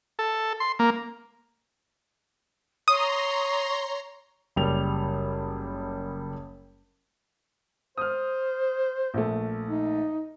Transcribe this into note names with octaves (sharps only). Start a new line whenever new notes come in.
A4
C6
A#3
C#5 A#5 C6 D#6
F#1 G3 F7
C5 D#6 F6
A#1 A3
D#4